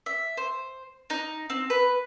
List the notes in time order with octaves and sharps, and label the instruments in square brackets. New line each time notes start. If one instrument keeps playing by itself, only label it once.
[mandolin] E5
C5
D#4
C4
B4